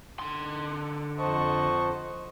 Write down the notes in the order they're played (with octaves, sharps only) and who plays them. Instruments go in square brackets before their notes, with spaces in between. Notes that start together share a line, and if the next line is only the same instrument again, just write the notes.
[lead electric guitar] D3 C6
[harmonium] F2 C5 A5 [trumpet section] D#5 F#5 C#6